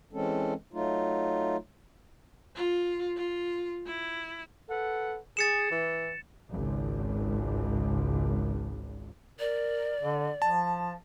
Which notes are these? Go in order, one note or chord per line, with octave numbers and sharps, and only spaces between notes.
E3 G#3 C4 C#4 A4
F#3 A3 D#4 F4
F4
F4
E4
A4 B4 F#5
G#4 A6 C#7 E7
E3
G#1 C#2
A#4 D5
D3
F3 A5